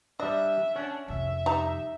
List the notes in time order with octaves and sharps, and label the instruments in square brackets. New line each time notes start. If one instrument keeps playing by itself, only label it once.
[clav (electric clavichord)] G3 D4 [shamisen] D#5 [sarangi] E5
[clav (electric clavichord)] C#4 F#5 [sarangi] D4
[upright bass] F2 C3 [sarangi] E5
[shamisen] G3 A#5 [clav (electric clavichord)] D#4